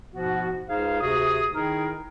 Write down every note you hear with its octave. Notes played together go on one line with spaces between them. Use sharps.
G#2 B2 F3 B3 F#4
C#2 D#4 G#4 C5 F5
D2 C3 F#4 G#4 D#6
D#3 D#4 E4 G#4 A#4